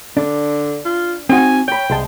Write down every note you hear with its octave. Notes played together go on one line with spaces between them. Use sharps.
D3 D4
F4
C4 D#4 F#4 G#5
C#5 G5 B5
C2 G#3 A5